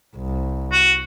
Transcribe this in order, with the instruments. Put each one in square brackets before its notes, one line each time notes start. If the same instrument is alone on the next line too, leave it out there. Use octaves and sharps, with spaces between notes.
[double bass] C2
[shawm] F#4